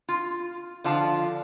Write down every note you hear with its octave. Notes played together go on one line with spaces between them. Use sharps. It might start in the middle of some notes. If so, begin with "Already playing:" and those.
F4
D3 F3 F4 A5